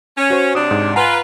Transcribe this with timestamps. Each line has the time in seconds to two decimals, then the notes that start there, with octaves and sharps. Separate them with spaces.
0.17 C#4
0.30 F#4 C5
0.55 C3 F#3 D4 D#6
0.71 G#2
0.96 F4 B4 F#5 G#5 A#5